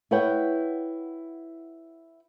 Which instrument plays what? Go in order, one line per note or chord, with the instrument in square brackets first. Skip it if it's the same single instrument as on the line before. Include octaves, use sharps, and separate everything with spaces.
[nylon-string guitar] E4 B4 C#5 F#5 G5